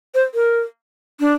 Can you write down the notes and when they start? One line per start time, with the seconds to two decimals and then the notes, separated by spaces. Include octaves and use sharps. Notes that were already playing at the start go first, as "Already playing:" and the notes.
0.15 C5
0.35 A#4
1.20 D4